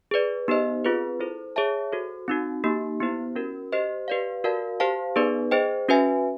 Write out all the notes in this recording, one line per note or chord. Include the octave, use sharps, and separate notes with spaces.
G#4 B4 D5
B3 D#4 G4 C5 D#5
C4 F4 G#4 B4
E4 A4 C5
G#4 C#5 E5 A5
F#4 A4 C5
C4 D#4 F#4
A#3 D#4 G4
B3 E4 G4 C5
C#4 F#4 A#4
G4 C5 D#5
G4 B4 D5 F5
F#4 A#4 D5 F5 A5
G4 C5 F5 A5
B3 D#4 G#4 B4 D5
G#4 C5 D#5 G5
C#4 F#4 B4 E5 G#5